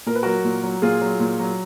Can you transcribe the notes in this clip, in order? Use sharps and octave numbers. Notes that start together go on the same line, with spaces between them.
A#2 A#4
B4
F#3 F#4 A#4
A#2
F#3
A#2 F4 G#4
F#3
A#2
F#3